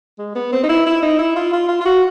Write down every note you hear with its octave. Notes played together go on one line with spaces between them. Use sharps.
G#3
B3
C4
D#4
E4
E4
D#4
E4
F4
F4
F4
F4
F#4